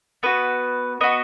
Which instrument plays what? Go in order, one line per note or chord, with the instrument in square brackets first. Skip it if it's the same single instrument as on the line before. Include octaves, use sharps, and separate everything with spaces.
[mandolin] B3 F#4 B4
B3 F#4 D#5